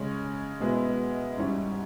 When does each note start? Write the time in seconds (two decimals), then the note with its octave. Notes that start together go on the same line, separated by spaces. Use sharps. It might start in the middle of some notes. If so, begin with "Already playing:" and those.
Already playing: C#3 G#3 C#4
0.61 B2 G#3 B3 E4
1.37 G#2 E3 G3 C#4 E4